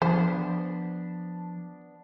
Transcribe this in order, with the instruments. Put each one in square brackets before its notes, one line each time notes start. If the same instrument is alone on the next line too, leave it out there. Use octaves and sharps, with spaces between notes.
[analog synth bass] F3 [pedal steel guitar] B3 D4 [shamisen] C5